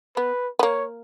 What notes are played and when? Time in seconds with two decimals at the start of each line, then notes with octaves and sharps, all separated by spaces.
0.17 B3 B4
0.59 B3
0.63 A#3 C#5